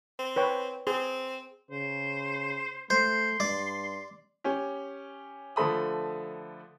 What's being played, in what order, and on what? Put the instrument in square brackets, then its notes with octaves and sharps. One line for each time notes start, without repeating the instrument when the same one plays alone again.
[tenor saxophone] C4
[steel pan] B4 C#5 G5
[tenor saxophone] C4 [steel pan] G#4
[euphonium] C#3 [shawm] C5
[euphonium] A3 [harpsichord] C5 [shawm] C6
[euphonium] G2 [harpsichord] D5
[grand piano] C#4 G4
D3 F3 A3 B5 D#6